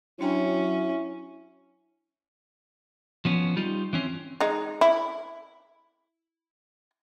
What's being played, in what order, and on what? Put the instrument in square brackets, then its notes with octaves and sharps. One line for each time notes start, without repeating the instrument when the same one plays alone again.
[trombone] F#3 [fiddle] C#4 [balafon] D4 G5 A#5 [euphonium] E4
[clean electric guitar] F3 B3 C#4
G3 D#4 F4 G4
E3 C4 C#4
[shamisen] G#3 D#4
E4